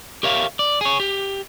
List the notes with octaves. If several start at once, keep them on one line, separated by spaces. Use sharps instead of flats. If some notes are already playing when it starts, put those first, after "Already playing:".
G4 A#4 C#5 E5 F5
D5
G#4 C#5
G4